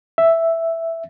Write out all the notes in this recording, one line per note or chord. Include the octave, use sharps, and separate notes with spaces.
E5